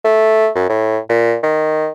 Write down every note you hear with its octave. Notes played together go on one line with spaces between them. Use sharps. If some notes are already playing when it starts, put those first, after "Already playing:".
A3
F#2
A2
A#2
D#3